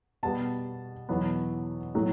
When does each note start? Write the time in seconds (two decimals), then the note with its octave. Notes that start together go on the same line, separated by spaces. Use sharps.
0.23 B2 G3 B3 A5
1.09 E2 B2 F#3 B3
1.95 A2 F#3 A3